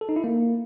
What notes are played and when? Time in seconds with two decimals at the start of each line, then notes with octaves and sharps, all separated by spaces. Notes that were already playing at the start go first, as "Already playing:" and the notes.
0.01 A4
0.09 D#4
0.16 E4
0.24 A#3